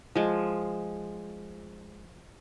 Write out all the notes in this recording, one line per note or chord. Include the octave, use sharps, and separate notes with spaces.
F3 G#3